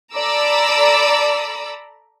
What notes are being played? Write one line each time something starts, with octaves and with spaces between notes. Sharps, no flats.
A4 D5 A#5 B5 D6 E6